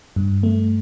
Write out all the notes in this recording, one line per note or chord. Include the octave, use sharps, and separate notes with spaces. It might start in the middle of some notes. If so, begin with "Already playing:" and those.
G2
A3